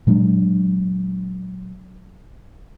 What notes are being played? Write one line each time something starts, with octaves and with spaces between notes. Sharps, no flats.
A#2 F#3 G#3 D4